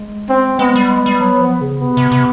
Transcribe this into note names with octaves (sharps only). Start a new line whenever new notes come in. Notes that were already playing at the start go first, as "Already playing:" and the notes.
Already playing: G#3
C4
G#3 B3
G3
G#3
G3
F#3
F3
C#3
C3 B3
C3
C3